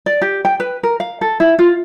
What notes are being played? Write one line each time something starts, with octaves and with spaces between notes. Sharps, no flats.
D5
G4
G5
B4
A#4
F5
A4
E4
F4